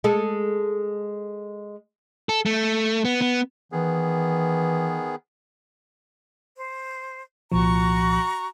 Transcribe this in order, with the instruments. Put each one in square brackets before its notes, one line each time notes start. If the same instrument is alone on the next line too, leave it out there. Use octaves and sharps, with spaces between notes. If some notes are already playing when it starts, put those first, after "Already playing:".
[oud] G#3 A4
[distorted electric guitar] A4
A3
B3
B3
[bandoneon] D#3 B3 G#4 [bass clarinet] E3
[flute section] C5
[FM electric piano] C2 A#2 F3 [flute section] F#4 A#5 C#6